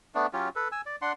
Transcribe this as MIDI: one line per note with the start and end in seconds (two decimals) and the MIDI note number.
0.15 0.27 57
0.15 0.27 59
0.15 0.27 62
0.33 0.49 54
0.33 0.49 61
0.33 0.49 65
0.33 0.49 67
0.56 0.68 69
0.56 0.68 71
0.72 0.81 80
0.72 0.81 88
0.86 0.96 74
1.02 1.13 62
1.02 1.13 78
1.02 1.13 84